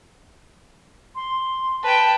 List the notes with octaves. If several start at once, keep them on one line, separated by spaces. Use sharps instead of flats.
C6
B4 G5 A5